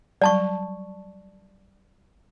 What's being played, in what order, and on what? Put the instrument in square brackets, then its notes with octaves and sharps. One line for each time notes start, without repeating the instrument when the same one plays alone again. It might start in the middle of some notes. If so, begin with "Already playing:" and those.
[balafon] F#3 G3 [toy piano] D5 A5 C#6